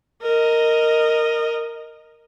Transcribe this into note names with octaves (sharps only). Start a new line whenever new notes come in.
A#4 D#5